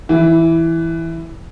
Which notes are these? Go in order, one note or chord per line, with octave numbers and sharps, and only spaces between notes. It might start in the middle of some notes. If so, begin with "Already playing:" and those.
E3